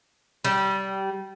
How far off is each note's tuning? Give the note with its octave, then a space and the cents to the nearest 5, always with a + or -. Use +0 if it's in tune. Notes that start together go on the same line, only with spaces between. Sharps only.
G3 -20